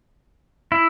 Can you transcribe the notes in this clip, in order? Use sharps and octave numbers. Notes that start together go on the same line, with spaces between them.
E4